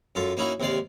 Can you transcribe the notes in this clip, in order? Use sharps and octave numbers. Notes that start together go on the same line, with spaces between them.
F#2 F4 A4
A#3 C#4 D#4 E4 F#4
D#2 C3 G#3 D5 F5